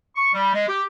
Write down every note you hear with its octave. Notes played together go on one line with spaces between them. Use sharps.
C#6
G3
G#3
G4